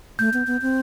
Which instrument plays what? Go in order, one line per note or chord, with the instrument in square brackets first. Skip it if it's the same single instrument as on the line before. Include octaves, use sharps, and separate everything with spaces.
[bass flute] A3 [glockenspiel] G6
[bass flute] B3
B3
C4